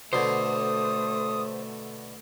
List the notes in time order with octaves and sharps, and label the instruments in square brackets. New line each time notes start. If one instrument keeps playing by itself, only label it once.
[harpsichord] B2 D3 [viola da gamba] A3 [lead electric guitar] C5 [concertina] D#6